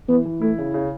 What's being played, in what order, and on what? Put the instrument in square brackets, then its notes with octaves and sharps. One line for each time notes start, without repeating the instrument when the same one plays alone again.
[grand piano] E3 [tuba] B3
[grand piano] E3
[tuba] A3 [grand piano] E4
[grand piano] C#3
C#3